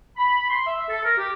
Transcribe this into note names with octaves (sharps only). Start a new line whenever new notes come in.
B5
C6
E5
A4
A#4
G4